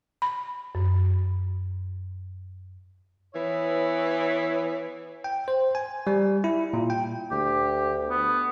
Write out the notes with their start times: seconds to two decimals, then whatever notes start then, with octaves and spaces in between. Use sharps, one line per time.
0.22 B5
0.75 F#2
3.34 E3 B3 E4 C#5
5.24 G5
5.48 C5
5.75 G#5
6.07 G3
6.44 E4
6.73 A#2
6.90 G5
7.31 D2 G4
8.10 B3